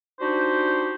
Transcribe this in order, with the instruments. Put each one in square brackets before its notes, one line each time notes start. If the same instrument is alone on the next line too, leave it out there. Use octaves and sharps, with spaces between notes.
[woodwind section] D4 D#4 F#4 G4 C5